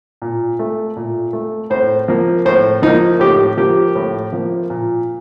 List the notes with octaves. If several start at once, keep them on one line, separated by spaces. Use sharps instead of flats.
A#2
A3
A#2
A3
A2 C5
F3 A#3
A2 C5
F3 A#3 D#4
A2 G4
F3 A#3 G4
A2
F3 A#3
A#2